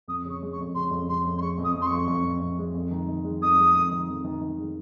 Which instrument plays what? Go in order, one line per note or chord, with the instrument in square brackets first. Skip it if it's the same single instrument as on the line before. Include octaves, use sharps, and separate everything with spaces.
[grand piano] F2 [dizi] D#6
[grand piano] C#3 [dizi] C#6
[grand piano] G#3
[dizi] C#6
[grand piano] F2
[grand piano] C#3 [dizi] C6
[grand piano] F2
[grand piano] C#3 [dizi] C6
[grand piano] F2
[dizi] C6
[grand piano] G#3 [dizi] C#6
[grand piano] F2
[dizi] D#6
[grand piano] F2
[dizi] C6
[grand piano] F2 [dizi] C#6
[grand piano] F2
F2
F2
G#3
F2
D#3
D#3
G#3
[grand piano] F2 [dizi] D#6
[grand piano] G#3
F2
D#3
F2
D#3
D#3
G#3